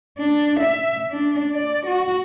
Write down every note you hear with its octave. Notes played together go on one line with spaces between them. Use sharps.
D4
E5
D4
D5
F#4